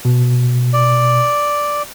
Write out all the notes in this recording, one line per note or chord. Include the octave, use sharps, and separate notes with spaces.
B2
D5